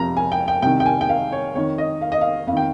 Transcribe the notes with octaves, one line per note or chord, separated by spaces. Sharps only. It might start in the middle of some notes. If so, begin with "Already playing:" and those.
Already playing: F2 C3 F3 A#5
G#5
G5
G5
C2 C3 D#3 G5
G5
G#5
G5
F5
C#5
F2 D#3 C#5
D#5
F5
D#5
F5
F2 F5
D#3 G5